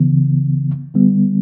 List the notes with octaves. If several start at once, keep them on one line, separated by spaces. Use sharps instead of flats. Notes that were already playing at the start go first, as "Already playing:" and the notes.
Already playing: C#2 C#3 E3 B3
D3 G3 B3